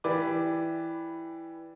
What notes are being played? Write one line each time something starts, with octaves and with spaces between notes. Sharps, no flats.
E3 G4 B4 D5 D6